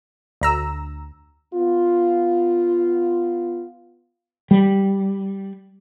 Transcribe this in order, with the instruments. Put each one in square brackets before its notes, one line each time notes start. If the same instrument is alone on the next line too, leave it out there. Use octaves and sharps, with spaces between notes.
[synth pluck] D2 A#5 E6
[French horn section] B3 F4
[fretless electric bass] G3